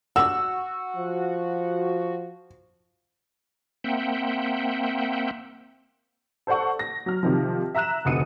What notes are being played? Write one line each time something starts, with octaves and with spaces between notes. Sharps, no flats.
D4 F#4 F#5 E6
F3
A#3 C4 E5 F#5 G5
A4 C5 D5 F#5 C#6
A#6
F#3 F6
C3 D#3 F3
E5 A#5 E6 F#6 E7
F1 D2 D#6 C#7 D#7